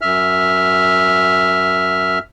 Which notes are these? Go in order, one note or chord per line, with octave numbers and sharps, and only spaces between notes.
F#2 E5 F6